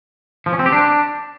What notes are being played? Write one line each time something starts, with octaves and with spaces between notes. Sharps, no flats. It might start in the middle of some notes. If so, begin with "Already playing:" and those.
F3
C#4
C4
G4
D4